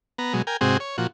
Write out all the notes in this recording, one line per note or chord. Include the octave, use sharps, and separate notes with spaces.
B3 A#5
B2 F#3 G#3
A#4 G5 G#5
G#2 C3 C4 F#4 G#4
C#5
A#2 F3 F#4